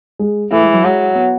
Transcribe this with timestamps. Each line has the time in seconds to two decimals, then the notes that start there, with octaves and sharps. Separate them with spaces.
0.19 G#3
0.52 E3 A3
0.62 G#3
0.73 F#3
0.84 F#3 G#3
1.15 B3